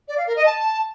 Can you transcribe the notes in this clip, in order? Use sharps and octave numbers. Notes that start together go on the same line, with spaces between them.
D5
F5
A#4
D#5
A5